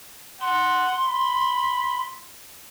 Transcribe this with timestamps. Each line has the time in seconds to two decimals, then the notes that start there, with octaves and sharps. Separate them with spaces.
0.41 F#5 C6
1.05 B5